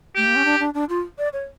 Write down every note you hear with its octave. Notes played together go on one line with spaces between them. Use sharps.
A3 G4
A#3
C#4
D4
D4
D4
F4
D5
C#5